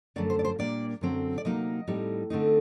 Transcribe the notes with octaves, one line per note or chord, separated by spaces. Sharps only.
F#2 D3 F#3 A3 D5
C5
D5
C5
A#2 G3 A#3 D4 D5
F#2 D3 F#3 C4
D5
C3 F#3 A#3 D#4 D#5
A2 G3 C4 D#4
D3 A3 C4 D#4